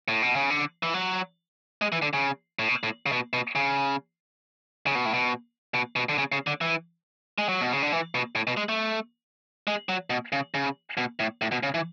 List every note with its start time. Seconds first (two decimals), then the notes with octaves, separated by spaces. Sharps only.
0.08 A2
0.22 B2
0.35 C#3
0.50 D3
0.83 E3
0.94 F#3
1.82 G#3
1.92 E3
2.02 D3
2.13 C#3
2.59 A2
2.69 B2
2.83 A2
3.06 C#3
3.12 B2
3.33 B2
3.56 C#3
4.87 C#3
4.95 B2
5.05 A2
5.14 B2
5.74 B2
5.96 B2
6.09 D3
6.18 C#3
6.32 C#3
6.47 D3
6.61 E3
7.38 G#3
7.49 F#3
7.61 B2
7.72 C#3
7.82 D3
7.92 E3
8.15 B2
8.36 A2
8.47 B2
8.57 G#3
8.69 A3
9.67 G#3
9.89 F#3
10.10 B2
10.32 C#3
10.54 C#3
10.97 B2
11.20 A2
11.42 A2
11.52 B2
11.63 C#3
11.74 E3